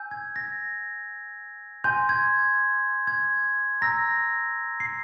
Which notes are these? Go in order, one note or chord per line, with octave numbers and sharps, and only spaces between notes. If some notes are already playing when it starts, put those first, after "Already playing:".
Already playing: G#5 E6 G6
G#6
A#6
G#5 C6 G6
G#6
G#6
A#5 E6 G6 A#6
C7